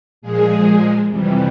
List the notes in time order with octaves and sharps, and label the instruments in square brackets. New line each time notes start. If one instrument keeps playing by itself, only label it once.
[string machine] A#2 F3 G#3 G#4
F2 C3 E3 G3